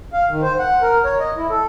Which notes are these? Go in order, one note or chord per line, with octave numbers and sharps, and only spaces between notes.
F5
D#3
C5
F#5
A#4
C#5
D#5
E4
A4